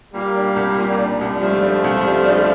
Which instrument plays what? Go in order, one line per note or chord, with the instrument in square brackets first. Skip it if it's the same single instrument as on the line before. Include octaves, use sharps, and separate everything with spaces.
[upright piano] A#2 [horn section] G3 A#3
[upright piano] D4
C2
A#2
D4
C2
[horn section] F3 A3 [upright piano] G3
[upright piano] D4
C2
G3
D4